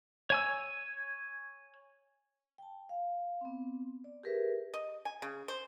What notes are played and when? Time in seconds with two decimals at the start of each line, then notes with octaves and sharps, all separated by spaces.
0.30 C#5 G#5 E6
2.58 G5 A5
2.89 F5
3.41 B3 C4
4.04 D5
4.23 G4 G#4 A#4 B4 E5
4.74 D#5
5.05 G#5
5.22 C#3
5.48 C5